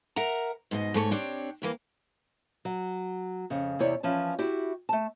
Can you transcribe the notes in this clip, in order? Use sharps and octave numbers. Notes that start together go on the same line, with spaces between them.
A#4 E5 F#5 A#5
G#2 B2 D#5
G#2 A3 B4 C#5
C4 D4 G4 C#5
A2 E3 A#3
F#3
F2 C#3
E2 C3 E4 C#5 D5
E3 F3 C#4 A5
E4 F#4 G4
A3 A5